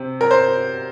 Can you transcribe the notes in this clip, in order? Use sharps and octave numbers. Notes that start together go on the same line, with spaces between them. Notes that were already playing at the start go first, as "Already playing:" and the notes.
Already playing: C3
A#4
C5